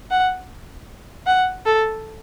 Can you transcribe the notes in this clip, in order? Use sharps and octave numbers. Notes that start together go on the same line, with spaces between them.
F#5
F#5
A4